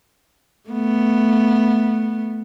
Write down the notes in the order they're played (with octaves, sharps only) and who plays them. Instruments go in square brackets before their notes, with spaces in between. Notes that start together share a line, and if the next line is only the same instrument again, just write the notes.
[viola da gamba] A3 B3